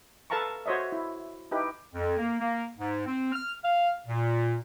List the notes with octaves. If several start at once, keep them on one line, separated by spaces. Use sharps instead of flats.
A4 B4 F5 A5 A#5 C#6
F#4 C5 C#5 D#5 E5
E4
D#4 E4 G4 B4
F2
A#3
A#3
G#2
C4
F6
F5
A#2